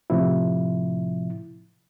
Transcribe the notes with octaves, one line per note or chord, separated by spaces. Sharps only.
A2 C3 F3 E4